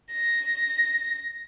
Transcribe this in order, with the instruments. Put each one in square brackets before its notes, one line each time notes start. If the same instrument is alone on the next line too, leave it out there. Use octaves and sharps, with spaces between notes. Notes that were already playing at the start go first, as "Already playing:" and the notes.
[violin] A#6